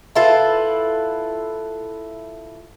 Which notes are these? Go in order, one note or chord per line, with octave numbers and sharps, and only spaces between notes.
E4 F4 A4 B4